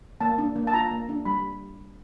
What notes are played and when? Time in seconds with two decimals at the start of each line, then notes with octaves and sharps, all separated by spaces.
0.21 A#3 A5
0.38 D4
0.56 A#3
0.67 A5
0.73 F4 A#5
0.91 A#3
1.09 D4
1.25 G3 B5